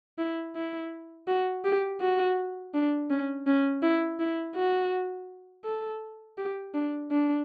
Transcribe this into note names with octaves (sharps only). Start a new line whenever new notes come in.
E4
E4
F#4
G4
F#4
D4
C#4
C#4
E4
E4
F#4
A4
G4
D4
D4